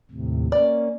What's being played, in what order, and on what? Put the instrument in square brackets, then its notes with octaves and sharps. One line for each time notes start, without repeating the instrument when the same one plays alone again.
[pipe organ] D#2 A2 C3
[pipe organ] A#3 C#4 [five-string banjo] D5